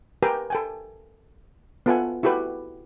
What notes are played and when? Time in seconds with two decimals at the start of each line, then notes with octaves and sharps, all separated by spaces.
0.23 G4 A#4 B4 G5 G#5 A#5
0.50 A4 G5 G#5
1.86 B3 F4 A4 E5 F#5 G#5
2.23 E4 F#4 G4 A4 B4